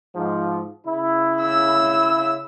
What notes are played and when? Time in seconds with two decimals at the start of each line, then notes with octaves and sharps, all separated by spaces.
0.16 G#2 F3
0.87 C#3 E4
1.41 E6